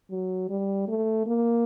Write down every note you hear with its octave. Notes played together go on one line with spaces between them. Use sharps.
F#3
G3
A3
A#3